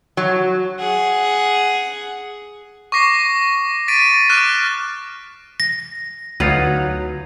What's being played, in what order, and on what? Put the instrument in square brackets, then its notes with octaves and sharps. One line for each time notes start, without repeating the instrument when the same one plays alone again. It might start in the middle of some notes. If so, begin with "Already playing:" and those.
[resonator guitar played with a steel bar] F#3
[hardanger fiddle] G#4 F#5
[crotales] C#6 D6 A#6 C7
A6 B6 D7 D#7
C#6 D6 F6 F#6 D7 E7
[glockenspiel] A#6
[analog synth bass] D2 [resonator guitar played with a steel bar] F#3 [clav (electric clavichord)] D#4 F4 B4